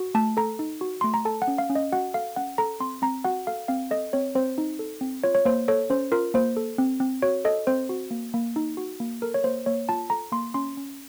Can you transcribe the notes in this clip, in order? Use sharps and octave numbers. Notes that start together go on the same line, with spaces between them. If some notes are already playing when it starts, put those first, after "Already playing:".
Already playing: F#4
A3 A5
A4 A#5
D#4
F#4
A3 C6
A#5
A4 A5
F#5
C#4
F5
C#4
D#5
F#4 F#5
A4 F5
C#4 F#5
A4 A#5
C4 C6
C4 A#5
F#4 F#5
A4 F5
C4 F5
A4 D#5
C4 C#5
C4 C5
D#4
A4
C4
F4 C#5
C#5
A#3 C5
A4 C#5
C#4 C5
F4 A#4
A#3 C5
A4
C4
C4
F#4 C#5
A4 D#5
C4 C5
F#4
A#3
A#3
D#4
F#4
A#3
A4 A#4
C#5
A#3 C5
A#3 C#5
F4 A5
A4 A#5
A#3 C6
C#4 C6
C#4